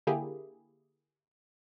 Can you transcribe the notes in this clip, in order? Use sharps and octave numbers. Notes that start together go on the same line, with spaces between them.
D3 A#3 E4 G4 G#4